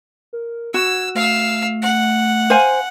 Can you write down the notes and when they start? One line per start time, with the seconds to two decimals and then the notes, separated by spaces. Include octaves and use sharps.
0.33 A#4
0.74 F#4 E6 G#6
1.15 A3 F5 E6
1.82 F#5
2.50 C5 F5 G#5